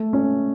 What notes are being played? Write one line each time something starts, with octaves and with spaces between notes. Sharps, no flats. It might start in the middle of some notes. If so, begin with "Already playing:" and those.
Already playing: A3
C#4